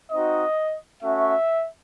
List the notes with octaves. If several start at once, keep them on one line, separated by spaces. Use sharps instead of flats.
C4 D#4 F#4 D#5
A3 C#4 F#4 E5